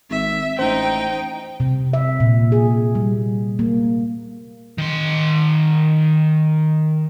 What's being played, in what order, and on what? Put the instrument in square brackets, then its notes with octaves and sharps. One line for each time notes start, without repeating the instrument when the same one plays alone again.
[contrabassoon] G#1 [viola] E5
[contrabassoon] A1 [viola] D#4 G5 [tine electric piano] C5
[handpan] C3
E5
A#2
G#4
G3
A#3
[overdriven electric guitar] D#3 C6